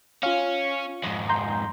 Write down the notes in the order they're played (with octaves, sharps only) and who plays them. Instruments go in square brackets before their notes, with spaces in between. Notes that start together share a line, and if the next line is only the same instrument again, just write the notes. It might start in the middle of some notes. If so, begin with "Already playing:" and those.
[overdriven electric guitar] C#4 [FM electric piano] F4 F5
[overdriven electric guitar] F2 G#2
[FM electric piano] A#5 C6 G6